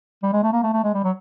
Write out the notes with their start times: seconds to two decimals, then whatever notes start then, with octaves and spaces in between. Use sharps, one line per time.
0.23 G3
0.33 G#3
0.44 A3
0.53 A#3
0.63 A3
0.73 A3
0.84 G#3
0.94 G3
1.04 F#3